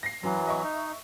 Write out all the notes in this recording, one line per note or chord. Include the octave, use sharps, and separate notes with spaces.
A#6 C7
F#2 E3 F#3
D#5 E5 C#6
D#4